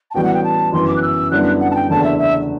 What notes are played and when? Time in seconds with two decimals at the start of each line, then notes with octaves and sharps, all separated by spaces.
0.11 A5
0.14 A1 A2 G3 B3 F#4 G5
0.24 F#5
0.34 G5
0.44 A5
0.73 G1 F#2 E3 C6
0.88 D6
0.96 F#6
1.02 E6
1.31 F#2 D3 G3 B3 E4 F#6
1.60 F#5
1.71 A5
1.75 G5
1.90 F#1 E2 D3 A3 A5
2.04 E5
2.18 E5